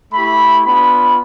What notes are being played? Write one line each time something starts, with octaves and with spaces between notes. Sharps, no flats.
A3 E4 G4 B5
B3 D4 F4 B5